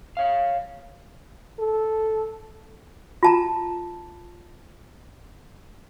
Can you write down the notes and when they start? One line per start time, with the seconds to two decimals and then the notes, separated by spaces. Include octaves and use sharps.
0.17 C#5 F5
1.59 A4
3.23 F4 A5 A#5